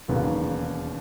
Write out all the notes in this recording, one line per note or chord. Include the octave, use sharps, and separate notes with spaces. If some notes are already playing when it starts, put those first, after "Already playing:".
E1 D#2 C#3 F#3 B3